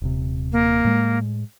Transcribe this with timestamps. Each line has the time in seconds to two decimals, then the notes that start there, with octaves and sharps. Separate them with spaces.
0.02 D#1 C3
0.52 A#3
0.85 A2 G#3